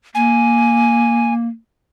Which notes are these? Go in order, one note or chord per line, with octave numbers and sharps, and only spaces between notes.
A#3 G#5